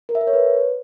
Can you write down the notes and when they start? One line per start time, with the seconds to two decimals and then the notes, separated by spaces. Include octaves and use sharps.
0.09 A#4
0.15 E5
0.21 A#4
0.27 C#5
0.33 B4